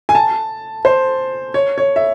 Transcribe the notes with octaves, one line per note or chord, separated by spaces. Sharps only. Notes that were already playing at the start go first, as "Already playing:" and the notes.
G#5
A5
C5
C#5
C#5
E5